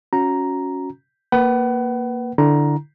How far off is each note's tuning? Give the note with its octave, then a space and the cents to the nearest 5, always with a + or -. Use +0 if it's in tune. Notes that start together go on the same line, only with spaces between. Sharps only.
C#4 +0 F#4 -20 A#5 +0
A#3 +0 B4 +0 F#5 +35
D3 +0 E4 +0 A#5 +10